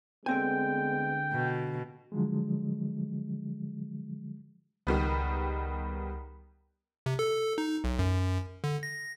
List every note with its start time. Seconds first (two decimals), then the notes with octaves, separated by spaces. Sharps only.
0.26 D2 D3 G#3 B3 C4 G5 G#5
1.32 B2
2.12 D3 F3 F#3 G#3
4.87 C#2 D#3 G3 B3
7.06 C3
7.19 A4
7.58 D#4
7.84 B1
7.99 F#2
8.64 D3
8.83 A#6